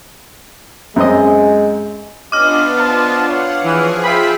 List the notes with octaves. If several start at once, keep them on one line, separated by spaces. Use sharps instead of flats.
F#2 G#3 C4 D#5
B3 C#4 D4 F4 G4 D#5 D6 F6
C5 D#5 A5
C#5 F5 F#5
E3 F3 G#4
F4 E5 F5 G5 B5